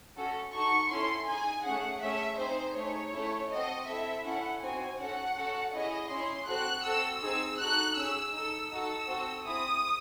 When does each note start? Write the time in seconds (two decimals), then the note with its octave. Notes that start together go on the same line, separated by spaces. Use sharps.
0.16 C#4 F#4 A4
0.53 D#4 F#4 A4 C#6
0.90 C#4 E4 A4 C6
1.27 D#4 G#4 G#5
1.64 A3 C#4 G#4 F#5
2.02 A3 C#4 G#4 E5
2.38 C4 D#4 G#4 C5
2.76 A3 D#4 G#4 C#5
3.13 A3 C#4 E4 A4
3.50 C4 F#4 A4 D#5
3.87 C4 E4 A4 E5
4.24 C#4 E4 A4 F#5
4.62 C4 D#4 F#4 G#5
4.99 C#4 F#4 A4 F#5
5.37 C#4 F#4 A4
5.73 C#4 E4 G#4 D#5
6.10 C#4 E4 G#4 C6
6.47 C4 F#4 A4 F#6
6.84 C4 F#4 A4 E6
7.22 C4 D#4 G#4 E6
7.59 D#4 F#4 A4 F#6
7.97 C#4 G#4 E6
8.33 D#4 A4 E6
8.70 D#4 F#4 A4 E6
9.07 C4 F#4 A4
9.45 C4 E4 G#4 D#6